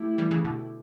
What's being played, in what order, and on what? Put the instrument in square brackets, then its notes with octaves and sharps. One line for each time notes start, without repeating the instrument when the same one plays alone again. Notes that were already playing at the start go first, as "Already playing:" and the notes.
Already playing: [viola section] A3 E4 G4
[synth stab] E3 G3
C#3 E3
B2 D3